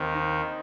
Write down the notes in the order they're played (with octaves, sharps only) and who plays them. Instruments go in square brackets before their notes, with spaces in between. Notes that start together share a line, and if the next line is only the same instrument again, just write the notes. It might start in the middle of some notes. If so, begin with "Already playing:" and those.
Already playing: [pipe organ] D#2 D#3 [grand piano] C4
[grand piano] D#4